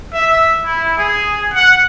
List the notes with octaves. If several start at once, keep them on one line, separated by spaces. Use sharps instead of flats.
E5
E4
G#4
F#5